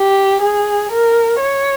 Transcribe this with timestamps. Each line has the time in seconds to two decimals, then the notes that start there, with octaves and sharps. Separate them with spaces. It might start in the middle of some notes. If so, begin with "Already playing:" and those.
Already playing: G4
0.41 G#4
0.91 A#4
1.41 C#5